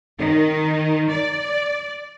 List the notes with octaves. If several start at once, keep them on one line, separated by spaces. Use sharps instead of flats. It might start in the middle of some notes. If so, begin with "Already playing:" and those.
D#3
D5